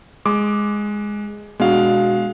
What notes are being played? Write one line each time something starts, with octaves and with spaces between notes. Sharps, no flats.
G#3 D6
B2 G#3 D4 F#4 F5